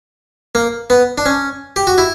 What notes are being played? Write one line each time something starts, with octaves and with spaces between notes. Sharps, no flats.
A#3
B3
D4
C#4
G4
F#4
E4